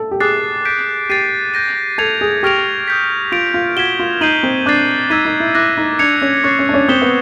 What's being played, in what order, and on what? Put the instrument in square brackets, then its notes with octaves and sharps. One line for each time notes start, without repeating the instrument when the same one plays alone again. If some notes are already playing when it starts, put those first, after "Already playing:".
Already playing: [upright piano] A4
G4
[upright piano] G#4 [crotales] D6 F#6 A6 C7
[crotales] G6 B6 D7
[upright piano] G4 [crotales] A6 C7 D#7
[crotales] G6 A#6 D#7
[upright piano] A4 [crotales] G#6 C#7 F7
[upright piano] G#4
[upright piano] G4 [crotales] C#6 F6 A#6 D7 F7
[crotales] D#6 G6 B6
[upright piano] F4 [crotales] A6 D7 F7
[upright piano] F4
[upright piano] F#4 [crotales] G#6 B6 E7 G7
[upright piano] F4
[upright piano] D#4 [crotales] G6 C7 D#7 F#7
[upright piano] C4
[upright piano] D4 [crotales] D6 F#6 A6 C7
[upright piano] D#4 [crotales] E6 G#6 B6 D#7
[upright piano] D#4
E4
[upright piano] E4 [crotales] D6 F#6 A#6
[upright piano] D#4
[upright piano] D4 [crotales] G#6 C#7 F7
[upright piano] C#4
[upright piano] C#4 [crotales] C#6 F#6 A6 C7
[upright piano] C#4
D4
C#4
[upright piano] C4 [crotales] D#6 G6 B6 E7 G7
[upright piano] B3